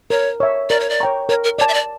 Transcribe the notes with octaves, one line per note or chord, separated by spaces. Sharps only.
A#4 C#5
C#5 E5
A#4 D5
C#5
D5
C#5 G5 A#5 C#6
A#4 C#5
A#4
C#5 D5 A5
E5
D5